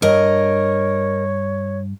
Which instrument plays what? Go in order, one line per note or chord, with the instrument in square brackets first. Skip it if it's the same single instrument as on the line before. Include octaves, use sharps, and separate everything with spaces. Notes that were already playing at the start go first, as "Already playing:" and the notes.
[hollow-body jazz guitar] G2 [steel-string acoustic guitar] A#4 D#5 [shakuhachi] C#5